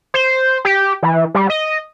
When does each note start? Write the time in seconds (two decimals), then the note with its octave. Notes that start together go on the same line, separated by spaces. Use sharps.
0.14 C5
0.65 G4
1.03 E3
1.35 G3
1.50 D#5